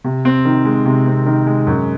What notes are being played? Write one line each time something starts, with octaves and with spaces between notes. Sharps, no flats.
C3
C4
D#3
G#3
C3
C4
D#3
G#3
F#2